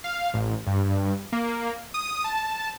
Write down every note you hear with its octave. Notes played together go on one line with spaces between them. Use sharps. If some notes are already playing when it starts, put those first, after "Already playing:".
F5
A1
G2
A#3
D#6
A5